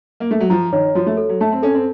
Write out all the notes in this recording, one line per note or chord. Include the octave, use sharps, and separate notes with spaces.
A#3
A3
F#3
F3 A#5
D#3 C#5
F3 F#4
A3
A4
F#3
A3 A5
C4
C#4 A4
C4